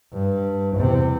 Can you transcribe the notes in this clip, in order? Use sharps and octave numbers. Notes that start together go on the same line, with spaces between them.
G2
E2 C3